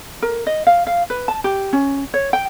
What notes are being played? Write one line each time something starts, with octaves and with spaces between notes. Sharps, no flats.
A#4
D#5
F5
F5
B4
A5
G4
C#4
C#5
G5